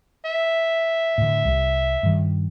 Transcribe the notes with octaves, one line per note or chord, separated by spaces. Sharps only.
E5
A2 D3
C2
G2 D#3